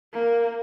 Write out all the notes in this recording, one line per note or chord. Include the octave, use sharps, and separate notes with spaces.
A#3